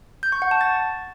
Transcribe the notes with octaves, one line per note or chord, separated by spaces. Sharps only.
G6
C#6
F#5
A5
A6